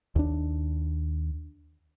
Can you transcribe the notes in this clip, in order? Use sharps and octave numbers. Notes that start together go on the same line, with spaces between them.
D#2 D4